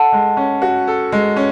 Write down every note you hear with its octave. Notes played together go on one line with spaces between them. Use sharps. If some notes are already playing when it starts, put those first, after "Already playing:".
Already playing: A4 F#5 A5
G#3
C#4
F#4
A4
G#3
C#4